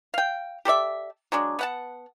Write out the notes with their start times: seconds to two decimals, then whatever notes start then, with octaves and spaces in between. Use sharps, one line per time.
0.14 F5 G5
0.65 G4 A4 D5 E5
1.32 F#3 G#3 D4
1.59 B3 F#5 A5